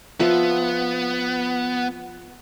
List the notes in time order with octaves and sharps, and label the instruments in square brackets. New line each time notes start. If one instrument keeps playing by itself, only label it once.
[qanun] F3 E5 [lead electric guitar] B3